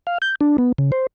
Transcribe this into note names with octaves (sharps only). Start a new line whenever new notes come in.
F5
G6
D4
B3
C#3
C5